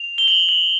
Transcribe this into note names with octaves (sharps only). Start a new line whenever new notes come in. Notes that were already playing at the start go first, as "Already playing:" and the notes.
Already playing: F7
G7
F#7
F#7